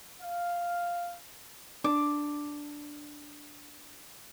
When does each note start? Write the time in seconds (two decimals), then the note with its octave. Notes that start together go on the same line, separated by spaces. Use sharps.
0.22 F5
1.84 D4 D6